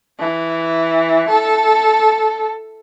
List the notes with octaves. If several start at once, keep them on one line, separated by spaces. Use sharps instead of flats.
E3
A4